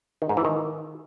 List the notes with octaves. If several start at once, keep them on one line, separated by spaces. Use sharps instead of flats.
D#3
G#2
E3
D#3